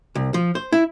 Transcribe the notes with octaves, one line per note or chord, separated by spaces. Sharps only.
C2
F3
C5
E4